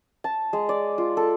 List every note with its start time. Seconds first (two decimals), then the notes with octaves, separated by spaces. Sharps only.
0.24 A5
0.53 G#3
0.69 D5
0.98 F4
1.17 A4